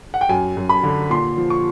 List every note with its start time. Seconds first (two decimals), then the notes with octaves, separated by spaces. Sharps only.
0.14 F#5
0.21 G5
0.29 F#2 G#5
0.57 F#2
0.69 B5
0.83 D3
1.10 A#2 C6
1.37 F3
1.50 C#6